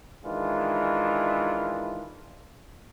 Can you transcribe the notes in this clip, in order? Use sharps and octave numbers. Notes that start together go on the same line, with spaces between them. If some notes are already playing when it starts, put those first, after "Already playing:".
D#3 E3 G#3 D4 E4 F4